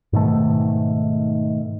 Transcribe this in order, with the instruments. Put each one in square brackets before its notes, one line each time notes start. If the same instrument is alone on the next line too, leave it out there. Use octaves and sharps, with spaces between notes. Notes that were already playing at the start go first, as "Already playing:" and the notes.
[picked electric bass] G#2 B2 D#3 A3